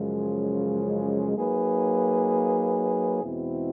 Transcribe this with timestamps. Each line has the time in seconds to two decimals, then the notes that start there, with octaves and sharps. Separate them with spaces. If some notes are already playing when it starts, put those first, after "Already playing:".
Already playing: F#2 C#3 F3 G#3
1.36 F#3 A#3 D#4 G#4 B4
3.23 E2 B2 G#3 C4 E4